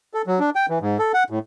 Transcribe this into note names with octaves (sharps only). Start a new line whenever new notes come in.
A4
F#3
D4
G5
E3
G#2
A4
F#5
A2